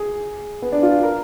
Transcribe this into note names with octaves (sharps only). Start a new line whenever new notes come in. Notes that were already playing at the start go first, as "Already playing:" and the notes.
Already playing: G#4
B3
D4
F4
A#4